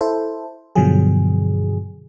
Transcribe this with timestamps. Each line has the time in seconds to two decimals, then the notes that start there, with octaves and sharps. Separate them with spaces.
0.01 E4 A4 C5
0.75 G2 B2 D3 F3 F#3 G#4